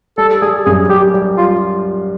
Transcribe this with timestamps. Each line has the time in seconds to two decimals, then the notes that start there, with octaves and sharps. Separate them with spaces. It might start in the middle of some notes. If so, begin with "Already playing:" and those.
0.18 G3 A4
0.41 G3 G#4
0.65 F#2 G#4
0.89 G3 G4
1.14 G3
1.38 F4